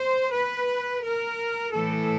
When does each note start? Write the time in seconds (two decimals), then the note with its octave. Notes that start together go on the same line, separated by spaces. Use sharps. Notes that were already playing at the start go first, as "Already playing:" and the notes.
Already playing: C5
0.32 B4
1.03 A#4
1.74 A2 E3 A3 A4